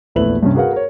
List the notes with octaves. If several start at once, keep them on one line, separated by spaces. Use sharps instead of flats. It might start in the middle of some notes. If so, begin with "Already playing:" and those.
A#1 E2 A3 E4 B4 F#7
G2 C3 C#4
F#4 G#4 A#4 B4 F5 F#5
A#4 C#5